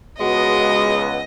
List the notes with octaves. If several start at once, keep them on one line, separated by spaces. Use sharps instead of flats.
C#2 G#3 B3 F#4 D#5